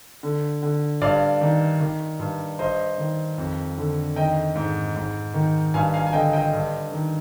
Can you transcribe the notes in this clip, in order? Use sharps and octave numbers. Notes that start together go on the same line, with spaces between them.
D3
D3
G2 D5 F5
D#3
D#3
G2
G2 C5 D#5
D#3
F2
D3
D#3 D#5 G5
G#2
G#2
D#3
G2 F5 G#5
F5 G#5
G#5
D3 D#5 G5
D#5 G5
G2
D#3